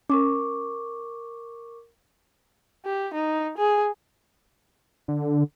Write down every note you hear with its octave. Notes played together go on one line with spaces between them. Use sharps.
C#4 A#4 C#6 D6
G4
D#4
G#4
D3